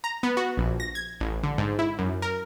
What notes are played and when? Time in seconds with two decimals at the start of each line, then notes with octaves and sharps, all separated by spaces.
0.04 A#5
0.23 B3
0.37 F#4
0.57 A#1
0.80 A#6
0.95 G#6
1.20 A1
1.43 D3
1.58 G#2
1.79 E4
1.99 F#2
2.22 A#4